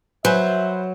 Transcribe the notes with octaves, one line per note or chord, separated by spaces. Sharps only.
F#3 B4 C5 E5 G#5